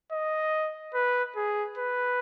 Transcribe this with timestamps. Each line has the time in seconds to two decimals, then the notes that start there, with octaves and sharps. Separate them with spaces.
0.12 D#5
0.94 B4
1.36 G#4
1.78 B4